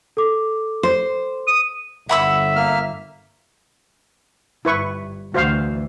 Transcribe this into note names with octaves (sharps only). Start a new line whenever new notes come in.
A4 D6
C5
D#6
G1 E5 F#5 B5 E6
A#3 F6
G1 G2 E4 B4 C#6
D2 E3 F#4 C5 F5